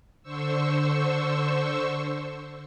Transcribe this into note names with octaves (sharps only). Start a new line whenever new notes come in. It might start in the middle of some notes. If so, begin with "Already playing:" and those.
D3 C5 C#6 E6